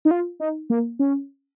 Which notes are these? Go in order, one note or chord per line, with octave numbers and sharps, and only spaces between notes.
D#4
F4
D#4
A#3
C#4